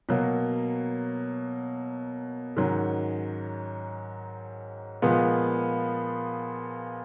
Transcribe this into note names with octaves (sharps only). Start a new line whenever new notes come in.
B2 F#3 A#3
G#2 D#3 F#3 C#4
A#2 F3 G#3 B3